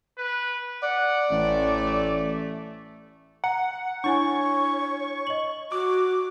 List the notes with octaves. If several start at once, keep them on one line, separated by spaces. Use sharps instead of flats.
B4
D5 F#5
A1 A3
F#5 A#5
D4 E4 C#5 G#5 C#6
D#5 F#7
F#4 D6